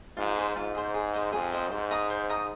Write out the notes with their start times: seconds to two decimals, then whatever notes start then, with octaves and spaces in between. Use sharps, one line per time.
0.17 G#2 F4
0.36 G#4 C5
0.56 G#2 F4
0.75 G#4 C5
0.94 G#4
1.14 C5 D#5
1.32 F2 G#4
1.52 C5 D#5
1.71 G#2 C5
1.91 D#5 A#5 D#6
2.10 C5
2.29 D#5 A#5 D#6